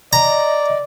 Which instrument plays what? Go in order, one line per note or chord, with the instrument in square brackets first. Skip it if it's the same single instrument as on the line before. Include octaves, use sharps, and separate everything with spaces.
[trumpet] D5 [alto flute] D#5 [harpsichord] A#5